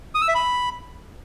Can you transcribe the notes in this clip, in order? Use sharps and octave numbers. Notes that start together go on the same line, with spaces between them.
D#6
E6
E5
B5